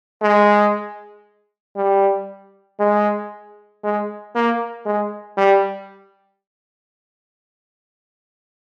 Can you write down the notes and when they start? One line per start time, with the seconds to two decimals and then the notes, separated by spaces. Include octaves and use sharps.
0.22 G#3
1.77 G3
2.80 G#3
3.84 G#3
4.36 A#3
4.86 G#3
5.38 G3